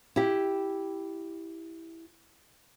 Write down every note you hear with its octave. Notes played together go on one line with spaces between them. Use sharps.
E4 G4